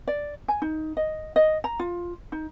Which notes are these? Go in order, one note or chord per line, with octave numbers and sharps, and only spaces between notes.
D5
G#5
D#4
D#5
D#5
A#5
F4
D#4